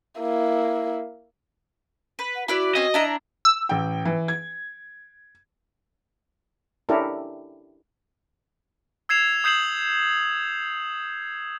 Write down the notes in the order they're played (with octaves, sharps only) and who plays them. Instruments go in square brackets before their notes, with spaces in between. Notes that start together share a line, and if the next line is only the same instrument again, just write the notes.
[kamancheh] A#3 E4
[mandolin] B4
[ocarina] F#5
[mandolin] E4 B4 D5 [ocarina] F#4
[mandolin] C4 C#4 G#5 [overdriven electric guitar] D#5
[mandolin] D4 E4 A#5
[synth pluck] E6
[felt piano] A1 G5
E3
G#6
[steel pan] C#4 D4 E4 G4 A4 A#4
[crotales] E6 G#6 C7 E7 F7
D#6 G6 C7 E7 F#7